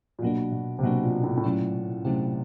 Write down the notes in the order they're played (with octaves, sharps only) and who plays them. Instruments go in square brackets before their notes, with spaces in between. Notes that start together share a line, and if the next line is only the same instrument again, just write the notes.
[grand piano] A#2
[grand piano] B2 [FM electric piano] F#3 A#3 D4
[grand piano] B2
C3
[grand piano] B2 [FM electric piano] F#3 A#3 D4
[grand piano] A#2
A2
A2
[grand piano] A#2 [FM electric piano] F#3 A3 C#4 E4
[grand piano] C3 [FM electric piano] F#3 A3 C#4 E4